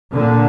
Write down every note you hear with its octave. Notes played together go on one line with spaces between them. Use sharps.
A#2 D3